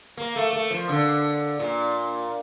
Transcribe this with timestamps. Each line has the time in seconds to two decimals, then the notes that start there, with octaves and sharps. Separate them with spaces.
0.17 A#3
0.36 A3
0.53 A3
0.70 F3
0.89 D3
1.59 A#2